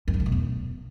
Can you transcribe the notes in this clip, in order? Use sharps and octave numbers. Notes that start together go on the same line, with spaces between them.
E2
F#2
D3
B2
E2